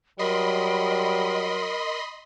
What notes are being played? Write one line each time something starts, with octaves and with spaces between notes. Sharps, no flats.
F#3 G3 A#4 D#5 B5 C6